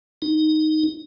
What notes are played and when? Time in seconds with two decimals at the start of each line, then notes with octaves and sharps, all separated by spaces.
0.22 D#4